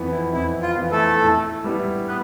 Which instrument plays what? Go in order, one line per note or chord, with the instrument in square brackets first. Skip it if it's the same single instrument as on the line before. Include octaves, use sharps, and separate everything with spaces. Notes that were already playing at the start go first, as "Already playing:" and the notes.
Already playing: [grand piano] F2 E3 B3
[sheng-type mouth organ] E4
[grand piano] F2 [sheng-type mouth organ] E4
[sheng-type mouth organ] F4
[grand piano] E3 B3
[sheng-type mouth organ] A3 A4
[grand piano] A2
G3 B3 E4
[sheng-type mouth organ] B3 B4